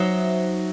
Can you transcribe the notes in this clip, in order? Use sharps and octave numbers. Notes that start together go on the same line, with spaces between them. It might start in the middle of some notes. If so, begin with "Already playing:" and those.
Already playing: F#3 D#4 F#4 C5 E5